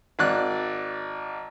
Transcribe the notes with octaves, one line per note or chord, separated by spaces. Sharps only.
G#1 D5 F#6